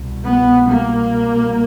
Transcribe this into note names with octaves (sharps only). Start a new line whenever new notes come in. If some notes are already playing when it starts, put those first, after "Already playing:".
Already playing: C2 B2
B3
A#3